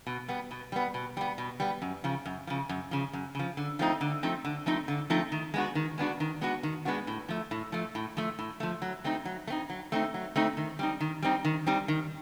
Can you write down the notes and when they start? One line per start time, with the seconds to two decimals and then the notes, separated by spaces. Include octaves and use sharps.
0.07 B2
0.28 G3 B3
0.51 B2
0.72 G3 B3
0.94 B2
1.17 G3 B3
1.38 B2
1.60 G3 B3
1.82 F#2
2.04 C#3 F3
2.26 F#2
2.47 C#3 F3
2.69 F#2
2.91 C#3 F3
3.13 F#2
3.35 C#3 F3
3.57 D3
3.79 F3 A3 C4 D#4
4.01 D3
4.23 F3 A3 C4 D#4
4.45 D3
4.66 F3 A3 C4 D#4
4.88 D3
5.10 F3 A3 C4 D#4
5.32 D#3
5.54 G#3 B3 D4 F#4
5.75 D#3
5.98 G#3 B3 D4 F#4
6.20 D#3
6.41 G#3 B3 D4 F#4
6.63 D#3
6.85 G#3 B3 D4 F#4
7.07 A2
7.28 F3 A3
7.51 A2
7.72 F3 A3
7.95 A2
8.17 F3 A3
8.39 A2
8.60 F3 A3
8.82 F#3
9.04 A3 C4 D#4
9.25 F#3
9.47 A3
9.50 C4 D#4
9.70 F#3
9.92 A3 C4 D#4
10.14 F#3
10.36 A3 C4 D#4
10.57 D#3
10.79 G3 C4 D#4
11.01 D#3
11.22 G3 C4 D#4
11.45 D#3
11.67 G3 C4 D#4
11.88 D#3